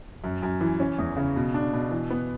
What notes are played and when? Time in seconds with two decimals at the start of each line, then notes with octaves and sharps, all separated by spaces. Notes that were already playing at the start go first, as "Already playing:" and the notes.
0.24 F#2
0.43 F#2
0.61 E3
0.80 C#4
0.98 E2
1.16 C#3
1.36 B2
1.54 D4
1.73 B2
1.91 E3
2.10 B3